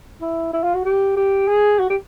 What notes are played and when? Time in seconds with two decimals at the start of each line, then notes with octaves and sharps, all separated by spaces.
0.21 E4
0.53 E4
0.63 F4
0.75 F#4
0.85 G4
1.17 G4
1.48 G#4
1.79 F#4
1.90 G4